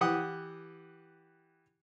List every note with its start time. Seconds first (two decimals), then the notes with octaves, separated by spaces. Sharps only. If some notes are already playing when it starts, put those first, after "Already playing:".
0.01 E3 G4 F#5 D#6